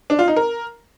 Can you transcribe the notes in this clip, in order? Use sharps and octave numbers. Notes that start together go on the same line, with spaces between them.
D4
F4
D#4
A#4